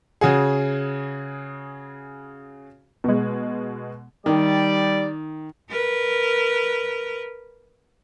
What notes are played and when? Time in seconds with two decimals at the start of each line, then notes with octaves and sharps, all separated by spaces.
0.21 C#3 F#4 G#4
3.04 B2 G#3
4.26 D#3 G3 D5
5.70 A#4 B4